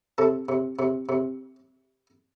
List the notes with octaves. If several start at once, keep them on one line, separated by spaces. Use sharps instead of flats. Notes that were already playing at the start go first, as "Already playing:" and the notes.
C3 A4
C3
C3
C3